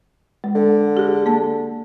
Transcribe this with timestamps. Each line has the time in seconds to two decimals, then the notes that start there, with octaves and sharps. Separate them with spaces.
0.44 G#3
0.55 D3
0.97 G4 G#4
1.26 A#3 A5